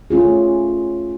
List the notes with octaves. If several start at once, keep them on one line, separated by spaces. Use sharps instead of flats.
A3 C#4 F4 G#4